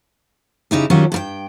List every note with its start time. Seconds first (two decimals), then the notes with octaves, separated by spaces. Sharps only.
0.71 C#3 D#4 E4 G4
0.90 D#3 F#3 G3 C#4 F4 F#4
1.12 G2 A#4 G5